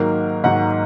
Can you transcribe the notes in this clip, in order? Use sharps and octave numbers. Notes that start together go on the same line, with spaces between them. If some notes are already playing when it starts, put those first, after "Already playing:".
Already playing: G#2 D#3 F#3 A#3 A#4
G#2 D#3 F#3 A#3 F#5